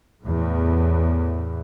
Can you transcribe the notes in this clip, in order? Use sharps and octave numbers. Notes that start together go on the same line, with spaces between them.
E2 A2